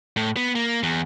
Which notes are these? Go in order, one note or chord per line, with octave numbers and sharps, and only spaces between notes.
A2
B3
A#3
E2